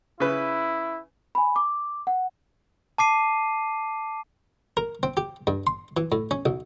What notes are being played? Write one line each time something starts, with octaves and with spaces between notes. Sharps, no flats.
C#3 E4 B4
G#5 B5
D6
F#5
A5 D6 C7 D#7
A#4
C4
G4
G2
C6
E3
A2
C#4
B1